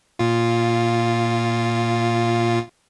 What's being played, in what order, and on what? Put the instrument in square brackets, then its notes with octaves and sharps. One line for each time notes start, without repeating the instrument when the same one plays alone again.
[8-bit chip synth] A#2 F4